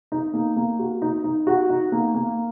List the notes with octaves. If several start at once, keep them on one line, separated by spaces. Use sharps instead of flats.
D#4
A#3
A#3
F#4
D#4
D#4
F#4
D#4
A#3
A#3